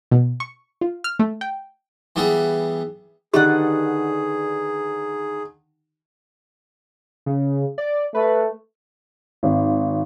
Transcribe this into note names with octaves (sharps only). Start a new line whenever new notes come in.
B2
C#6
F4
F6
A3
G5
E3 G3 B3 G#4
D3 D#3 D#4 G4 G#4 B4 D5 F#5
C#3
D5
A3 B4
G#1